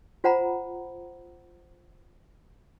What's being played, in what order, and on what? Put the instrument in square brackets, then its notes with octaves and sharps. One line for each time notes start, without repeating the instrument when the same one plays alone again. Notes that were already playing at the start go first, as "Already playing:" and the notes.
[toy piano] F4 C5 F#5 A#5 B5